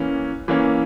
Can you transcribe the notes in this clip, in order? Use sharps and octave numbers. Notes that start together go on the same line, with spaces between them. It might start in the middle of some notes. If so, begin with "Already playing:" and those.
Already playing: E3 A#3 C#4
E3 A#3 C#4